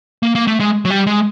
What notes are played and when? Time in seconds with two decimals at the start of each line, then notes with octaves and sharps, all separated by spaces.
0.23 A#3
0.35 A#3
0.47 A3
0.60 G#3
0.85 F#3
0.90 G3
1.07 G#3